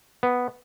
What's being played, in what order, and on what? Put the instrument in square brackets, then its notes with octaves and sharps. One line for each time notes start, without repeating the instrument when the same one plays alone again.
[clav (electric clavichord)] B3